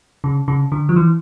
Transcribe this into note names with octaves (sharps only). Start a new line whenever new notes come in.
C#3
C#3
D3
F3
E3